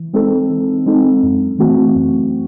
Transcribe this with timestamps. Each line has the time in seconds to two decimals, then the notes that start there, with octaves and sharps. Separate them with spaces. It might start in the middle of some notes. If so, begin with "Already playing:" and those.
Already playing: E3
0.13 G#3 C4 D#4 A4
0.50 E3
0.86 G#3 C4 D#4 A4
1.23 F#2
1.59 E3 A3 C4 F#4
1.95 F#2